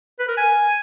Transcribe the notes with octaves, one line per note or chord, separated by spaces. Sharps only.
B4
A#4
G#5